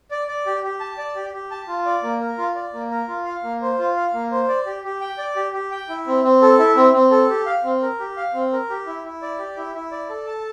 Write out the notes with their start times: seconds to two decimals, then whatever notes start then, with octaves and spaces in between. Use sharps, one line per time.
0.11 D5
0.28 D5
0.46 G4
0.64 G4
0.80 A5
0.98 D5
1.15 G4
1.33 G4
1.51 A5
1.68 F4
1.86 D5
2.03 A#3
2.21 A#4
2.38 F4
2.55 D5
2.74 A#3
2.90 A#4
3.08 F4
3.25 F5
3.44 A#3
3.62 C5
3.79 F4
3.96 F5
4.14 A#3
4.31 C5
4.49 D5
4.66 G4
4.84 G4
5.01 G5
5.18 D5
5.36 G4
5.54 G4
5.71 G5
5.89 E4
6.07 C4
6.24 C4
6.42 A4
6.59 E4
6.77 C4
6.93 C4
7.11 A4
7.30 G4
7.46 F5
7.64 C4
7.82 A#4
8.00 G4
8.17 F5
8.34 C4
8.52 A#4
8.70 G4
8.87 E4
9.04 E4
9.22 D5
9.39 G4
9.57 E4
9.75 E4
9.91 D5
10.09 A4
10.27 A5